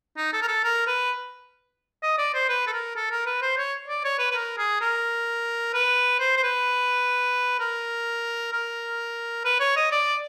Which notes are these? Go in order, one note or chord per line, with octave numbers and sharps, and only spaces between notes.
D#4
A4
A#4
A4
A#4
B4
D#5
D5
C5
B4
A4
A#4
A4
A#4
B4
C5
C#5
D5
C#5
B4
B4
A#4
G#4
A#4
B4
C5
C5
B4
A#4
A#4
B4
C#5
D#5
D5